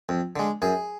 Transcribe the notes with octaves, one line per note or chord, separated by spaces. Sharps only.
F2
D3 G#3
F#2 G#4